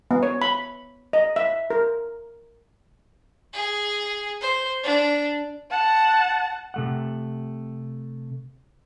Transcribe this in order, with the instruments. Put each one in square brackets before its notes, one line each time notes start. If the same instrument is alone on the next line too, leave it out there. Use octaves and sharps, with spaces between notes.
[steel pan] B3
C#5
B5
D#5
E5
A#4
[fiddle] G#4
C5
D4
[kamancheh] F#5 A5
[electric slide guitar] C3 A3 F#5